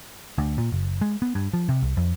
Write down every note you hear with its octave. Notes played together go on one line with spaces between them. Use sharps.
D2
A#2
F#1
G#3
B3
G2
F3
C3
C2
F2